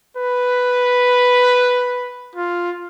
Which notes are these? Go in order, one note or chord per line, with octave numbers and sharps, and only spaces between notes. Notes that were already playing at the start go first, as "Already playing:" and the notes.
B4
F4